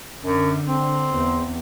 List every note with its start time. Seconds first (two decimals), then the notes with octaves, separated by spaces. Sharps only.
0.22 F#2 D3
0.67 C4
1.11 E2